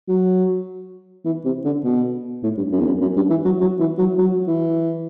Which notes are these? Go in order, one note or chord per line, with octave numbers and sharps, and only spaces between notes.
F#3
E3
C3
D3
B2
A2
G2
F#2
E2
F#2
F#2
G2
E3
F#3
F#3
E3
F#3
F#3
E3